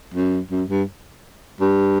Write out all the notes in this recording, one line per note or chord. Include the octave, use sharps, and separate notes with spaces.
F#2
F#2
G2
G2